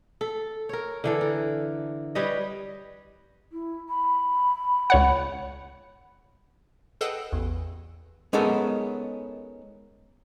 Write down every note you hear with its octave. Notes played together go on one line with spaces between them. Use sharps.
A4
A#4 C#5
D3 E3 A4
A#4
G3 B4 C#5 D#5
E4
B5
C#2 C#5 F#5
G#4 A4 B4 D#5 F#5 G5
A1 E2
G#3 B3 C#4 D#4 A4 A#4